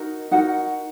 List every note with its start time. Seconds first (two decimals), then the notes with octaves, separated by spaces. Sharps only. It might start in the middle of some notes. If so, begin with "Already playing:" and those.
Already playing: D#4 F#4 A#4
0.31 D#4 F#4 A#4 F#5